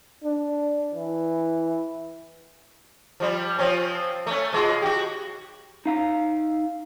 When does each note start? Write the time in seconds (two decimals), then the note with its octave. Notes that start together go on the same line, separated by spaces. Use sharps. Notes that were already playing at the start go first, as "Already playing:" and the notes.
0.24 D4
0.94 E3
3.20 F3 G3
3.58 F3 C4 C#4
4.27 A3 C#4
4.53 B2 G#3 F4
4.82 F#4 G4
5.86 D#4 F5 A#5